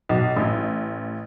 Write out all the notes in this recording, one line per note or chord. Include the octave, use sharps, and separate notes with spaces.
B1
A1